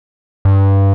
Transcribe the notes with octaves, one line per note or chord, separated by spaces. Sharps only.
G2